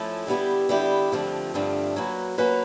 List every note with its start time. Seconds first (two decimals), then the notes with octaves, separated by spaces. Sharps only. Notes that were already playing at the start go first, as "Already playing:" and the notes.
Already playing: F3 A3 C#4 E4 A4
0.27 D3 G3 B3 E4 G4
0.69 D3 G3 B3 E4 G4
1.12 G2 D3 F3 A3 C4
1.54 G2 D3 F3 A3 C4
1.96 F#3 A#3 C#4 F#4 B4
2.38 F#3 A#3 C#4 F#4 B4